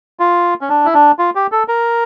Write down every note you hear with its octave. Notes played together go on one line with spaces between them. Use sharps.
F4
C#4
D4
E4
D4
F4
G4
A4
A#4